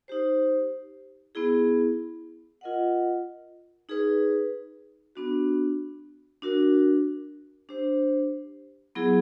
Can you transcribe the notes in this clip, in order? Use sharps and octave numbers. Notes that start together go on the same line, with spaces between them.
D#4 G4 C5
B3 E4 G#4
F4 A#4 D#5 F#5
D#4 G#4 B4
B3 D4 F#4
D4 F#4 A#4
D4 G4 C5
F#3 B3 E4 G#4